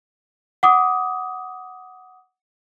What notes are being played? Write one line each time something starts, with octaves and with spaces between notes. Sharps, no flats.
F#5 D6 D#6